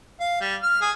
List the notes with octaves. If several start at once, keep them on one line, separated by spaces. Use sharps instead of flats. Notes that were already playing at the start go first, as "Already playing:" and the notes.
F5
G3
F6
G#4